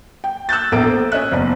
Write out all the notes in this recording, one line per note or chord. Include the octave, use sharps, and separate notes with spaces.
G5
E6 F#6 G6 A6
A#1 E2 A#3 A4 D7
A4 C5
C#4 D#5 E5 F#6
F#1 E2 D5